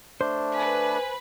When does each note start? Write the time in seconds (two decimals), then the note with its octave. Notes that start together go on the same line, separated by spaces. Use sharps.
0.21 A3 D4 C5
0.55 B4 G#5